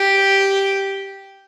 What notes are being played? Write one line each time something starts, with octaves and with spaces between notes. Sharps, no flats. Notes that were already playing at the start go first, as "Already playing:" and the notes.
Already playing: G4